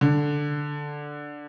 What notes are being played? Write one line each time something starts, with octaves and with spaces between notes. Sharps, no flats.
D3